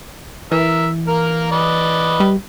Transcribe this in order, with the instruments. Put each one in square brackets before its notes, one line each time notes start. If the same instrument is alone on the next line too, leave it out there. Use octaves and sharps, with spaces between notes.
[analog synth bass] E3 [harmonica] A#4 E5
[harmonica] A#3 A#4
B4 D5 D#5
[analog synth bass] G3